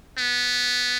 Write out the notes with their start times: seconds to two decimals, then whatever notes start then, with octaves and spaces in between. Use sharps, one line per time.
0.18 B3